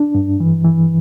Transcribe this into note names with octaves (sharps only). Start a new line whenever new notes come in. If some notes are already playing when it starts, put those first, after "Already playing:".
Already playing: D4
G2
E3
E3